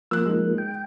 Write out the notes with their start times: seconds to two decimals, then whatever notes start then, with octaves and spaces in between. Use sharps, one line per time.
0.11 F3 A#3 E6 F#6
0.26 G#3 D#4
0.58 G5